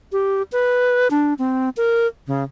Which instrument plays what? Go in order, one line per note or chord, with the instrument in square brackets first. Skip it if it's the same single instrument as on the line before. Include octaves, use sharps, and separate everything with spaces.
[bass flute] G4
B4
D4
C4
A#4
C#3